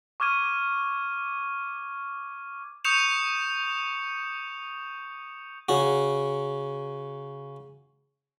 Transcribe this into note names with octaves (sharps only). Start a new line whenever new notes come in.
C#6 D6 F6 G#6 D#7
C#6 D#6 G6 C#7 E7 F7
C#3 F#4